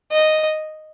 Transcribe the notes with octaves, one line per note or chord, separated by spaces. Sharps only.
D#5